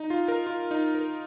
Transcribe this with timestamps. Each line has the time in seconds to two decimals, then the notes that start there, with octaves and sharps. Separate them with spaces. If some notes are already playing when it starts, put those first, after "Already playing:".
Already playing: D#4
0.10 F4
0.28 A#4
0.47 F4
0.71 D#4
0.95 A#4